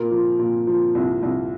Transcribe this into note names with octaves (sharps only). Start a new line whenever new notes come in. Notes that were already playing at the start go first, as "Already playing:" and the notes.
Already playing: A#2 A#4
F3
A#2
F3
C2
C2